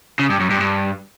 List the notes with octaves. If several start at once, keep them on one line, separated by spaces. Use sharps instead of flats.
C#3
G2
F#2
G2
G2